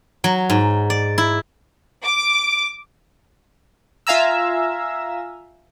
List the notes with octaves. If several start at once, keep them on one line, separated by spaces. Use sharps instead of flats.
F#3
G#2
D5
E4
D6
F4 E5 F5 G#5 A#5 E6